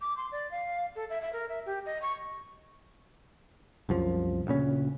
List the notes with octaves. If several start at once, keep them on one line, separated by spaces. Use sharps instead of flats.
D6
C6
D5
F5
A4
E5
E5
A#4
E5
G4
D#5
C#6
C2 F#2 F3
D2 A#2 C#3 C#4